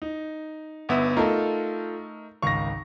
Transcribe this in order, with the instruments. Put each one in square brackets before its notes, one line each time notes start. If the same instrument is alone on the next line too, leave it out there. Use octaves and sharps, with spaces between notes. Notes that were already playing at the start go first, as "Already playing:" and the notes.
[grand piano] D#4
[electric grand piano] G1 B3 E5
[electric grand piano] A3 D#4 A#4 [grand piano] F4 A4
[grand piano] G#1 C#2 F5 [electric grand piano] C#6 A#6